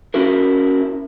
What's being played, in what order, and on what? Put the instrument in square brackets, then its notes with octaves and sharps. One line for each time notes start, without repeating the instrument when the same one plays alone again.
[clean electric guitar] C#4 E4 F#4 A#4